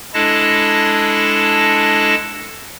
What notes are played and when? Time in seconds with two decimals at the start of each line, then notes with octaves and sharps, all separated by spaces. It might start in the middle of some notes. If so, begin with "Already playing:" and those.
0.14 G#3 D4 E4 A4 A5 A#6